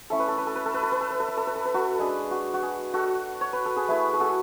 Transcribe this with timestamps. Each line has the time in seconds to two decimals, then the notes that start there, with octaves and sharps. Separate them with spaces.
0.10 A3 C#4 E4 A4
0.19 B4
0.28 A4
0.38 B4
0.47 A4
0.55 B4
0.66 A4
0.74 B4
0.83 A4
0.92 B4
1.01 A4
1.10 B4
1.20 A4
1.28 B4
1.37 A4
1.47 B4
1.56 A4
1.65 B4
1.74 F#4 A4
1.99 G#3 D4 G#4
2.31 F#4
2.54 F#4
2.62 G#4
2.94 F#4 A4
3.41 C#5
3.53 B4
3.65 A4
3.76 G#4 B4
3.88 A3 E4 G#4 B4
4.13 G#4
4.20 F#4 A4